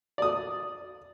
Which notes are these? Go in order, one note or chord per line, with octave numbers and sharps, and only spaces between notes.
D5 D#6